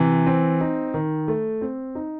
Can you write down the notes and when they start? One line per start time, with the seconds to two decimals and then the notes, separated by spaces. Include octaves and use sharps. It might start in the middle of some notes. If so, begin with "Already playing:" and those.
Already playing: C3 E3
0.26 C4
0.61 D#4
0.94 D#3
1.28 A3
1.61 C4
1.95 D#4